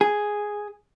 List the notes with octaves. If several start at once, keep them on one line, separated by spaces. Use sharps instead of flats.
G#4